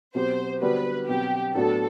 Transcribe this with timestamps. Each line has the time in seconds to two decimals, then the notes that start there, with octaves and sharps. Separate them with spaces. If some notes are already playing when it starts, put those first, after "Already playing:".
0.15 B2 F#3 C4 G4 C5
0.61 D3 G3 B3 D4 F#4 B4
1.08 B2 F#3 C4 G4
1.55 A2 F#3 B3 D4 F#4 A4